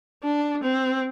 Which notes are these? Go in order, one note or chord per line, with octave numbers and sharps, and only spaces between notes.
D4
C4